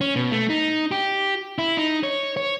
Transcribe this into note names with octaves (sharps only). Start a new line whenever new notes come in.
C#4
B2
A3
D#4
G4
E4
D#4
C#5
C#5